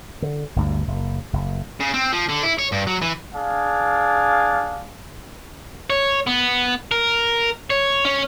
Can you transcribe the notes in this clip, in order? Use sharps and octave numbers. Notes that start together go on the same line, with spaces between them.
D3
G1 D2 G2
F#1
F#1
C#3
C4
F3
D3
E4
C#5
G2
F#3
E3
D4 G#4 F5
C#5
B3
A#4
C#5
C#4